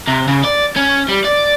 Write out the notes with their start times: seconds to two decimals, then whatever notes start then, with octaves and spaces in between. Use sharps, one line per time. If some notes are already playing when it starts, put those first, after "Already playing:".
0.07 C3
0.28 C#3
0.44 D5
0.76 C#4
1.09 G3
1.25 D5